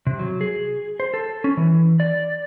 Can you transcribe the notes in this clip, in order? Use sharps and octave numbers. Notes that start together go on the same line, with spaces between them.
C3
F#3
G#4
C5
A4
C#4
E3
D5